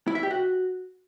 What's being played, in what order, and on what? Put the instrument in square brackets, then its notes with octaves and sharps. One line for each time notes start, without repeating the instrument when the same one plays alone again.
[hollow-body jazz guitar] E4
E5
G4
F#4